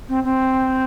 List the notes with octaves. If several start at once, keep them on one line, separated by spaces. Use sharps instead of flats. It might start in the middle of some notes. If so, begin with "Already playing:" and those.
C4
C4